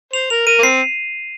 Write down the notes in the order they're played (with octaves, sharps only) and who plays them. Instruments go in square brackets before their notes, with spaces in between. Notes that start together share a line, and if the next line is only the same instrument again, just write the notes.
[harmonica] C5 [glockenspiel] F7
[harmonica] A#4 [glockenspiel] F7
[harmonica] A#4 [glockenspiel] D#7
[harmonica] A#3
[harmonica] C4 [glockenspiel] C7